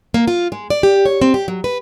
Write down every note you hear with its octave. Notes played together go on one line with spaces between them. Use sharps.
A#3
F4
G#3
D5
G4
C#5
C4
G4
F#3
B4